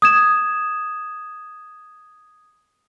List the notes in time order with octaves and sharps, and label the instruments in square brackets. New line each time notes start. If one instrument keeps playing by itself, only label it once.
[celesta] D#6 G#6 E7